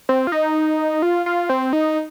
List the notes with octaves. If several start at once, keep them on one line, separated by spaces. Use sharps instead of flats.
C4
F4
D#4
F4
F4
C4
D#4